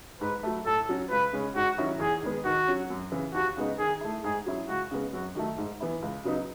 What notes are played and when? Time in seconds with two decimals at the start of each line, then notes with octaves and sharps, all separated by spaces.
0.21 G#2 B4
0.43 F#3 A3
0.66 A2 A4
0.89 F#3 C#4 F#4
1.10 C#2 B4
1.33 C#3 G#3 C#4
1.56 G#2 F#4
1.78 D#3 F#3 C#4 E4
2.00 E2 G#4
2.22 D#3 G#3 B3
2.45 D#3 F#4
2.68 F#3 C#4
2.90 F#2
3.12 C#3 E3
3.34 D#2 F#4
3.57 C#3 G#3 B3 D#4
3.79 D#3 G#4
4.01 A3 E4
4.24 G#2 G#4
4.46 F#3 C#4 E4
4.68 C#2 F#4
4.91 C#3 G#3 B3
5.13 F#2 F#4
5.35 D#3 F#3 A3
5.58 G#2
5.80 E3 B3 E4
6.02 C#2
6.24 C#3 F#3 B3 D#4